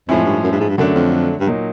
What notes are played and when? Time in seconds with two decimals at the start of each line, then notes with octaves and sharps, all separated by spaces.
0.08 F2 A2 F3 G#3 C#4 E4
0.25 G2
0.43 F#2
0.52 G2
0.60 G#2
0.69 G2
0.78 F#2 D3 F#3 A3 D4
0.95 F2
1.40 G2
1.47 A#2 F#3 A#3 D#4